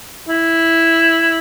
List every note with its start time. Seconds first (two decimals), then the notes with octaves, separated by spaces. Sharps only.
0.29 E4